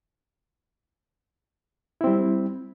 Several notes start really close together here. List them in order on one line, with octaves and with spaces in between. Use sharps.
E4 C4 G3